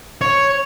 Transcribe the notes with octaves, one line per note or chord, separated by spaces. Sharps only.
C#5